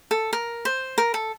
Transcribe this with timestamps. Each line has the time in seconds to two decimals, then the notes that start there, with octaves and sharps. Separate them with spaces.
0.11 A4
0.33 A#4
0.65 C5
0.98 A#4
1.14 A4